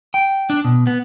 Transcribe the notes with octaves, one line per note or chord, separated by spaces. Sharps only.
G5
D4
B2
B3